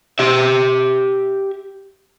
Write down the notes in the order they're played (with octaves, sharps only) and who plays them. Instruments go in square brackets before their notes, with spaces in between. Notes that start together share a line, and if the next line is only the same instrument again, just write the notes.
[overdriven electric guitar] G4 E5